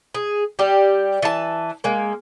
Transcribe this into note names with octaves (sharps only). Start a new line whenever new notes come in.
G#4
G3 G4
E3 A5
G#3 A#3